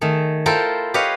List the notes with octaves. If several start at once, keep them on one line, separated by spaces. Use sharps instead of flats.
D#3 A3 G#4
E4 F4 A4 A#4 C5 G5
G4 B4 C#5 D#5 F5